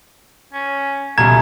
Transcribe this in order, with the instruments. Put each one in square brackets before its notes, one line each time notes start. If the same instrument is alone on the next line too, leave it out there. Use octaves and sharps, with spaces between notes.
[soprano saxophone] C#4
[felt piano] C#2 B2 G3 [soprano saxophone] A3 [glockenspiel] A#5 [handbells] G#6